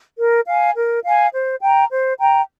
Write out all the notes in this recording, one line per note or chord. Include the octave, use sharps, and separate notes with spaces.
A#4
F5 G#5
A#4
F5 G#5
C5
G5 A#5
C5
G5 A#5